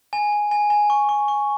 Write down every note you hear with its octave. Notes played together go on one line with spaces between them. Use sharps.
G#5
G#5
G#5
G#5
C#6
C#6
C#6